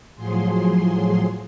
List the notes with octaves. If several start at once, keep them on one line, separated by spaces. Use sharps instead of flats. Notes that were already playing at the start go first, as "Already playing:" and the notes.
A2 F3 F#3 G#4 C6